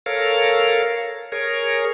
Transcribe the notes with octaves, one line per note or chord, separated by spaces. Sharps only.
A4 A#4 C#5 F5
G#4 A#4 C#5